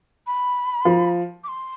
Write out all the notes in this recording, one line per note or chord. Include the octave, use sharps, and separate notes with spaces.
B5
F3
D6
C6